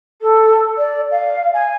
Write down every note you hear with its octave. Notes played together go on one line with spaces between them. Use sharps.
A4
D5
F5
G#5